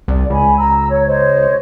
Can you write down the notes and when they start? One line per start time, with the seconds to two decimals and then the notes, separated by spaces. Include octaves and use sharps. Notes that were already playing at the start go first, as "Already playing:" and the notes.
0.08 C2 D5
0.30 C#2 G#5 B5
0.58 A#5 E6
0.87 C#5
1.06 C5 C#5 D#5